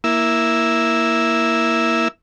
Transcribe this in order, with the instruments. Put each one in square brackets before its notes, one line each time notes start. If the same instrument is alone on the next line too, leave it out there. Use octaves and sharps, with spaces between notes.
[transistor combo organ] A#3 E4 E6